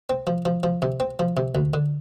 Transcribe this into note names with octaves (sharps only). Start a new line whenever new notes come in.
C4
F3
F3
F3
C3
C4
F3
C3
D2
D3